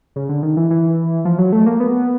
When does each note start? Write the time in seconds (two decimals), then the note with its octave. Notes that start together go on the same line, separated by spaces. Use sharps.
0.16 C#3
0.29 D3
0.43 D#3
0.57 E3
0.71 E3
1.25 F3
1.38 F#3
1.52 A3
1.66 A#3
1.80 B3